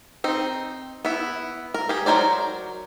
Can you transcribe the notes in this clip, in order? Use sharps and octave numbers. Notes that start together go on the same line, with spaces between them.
C4 D#4
B3 E4
A#4
G4 G#4
F#3 F4 A#4 C5 D5